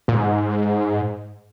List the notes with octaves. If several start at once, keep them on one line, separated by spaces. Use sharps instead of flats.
A#2
G#2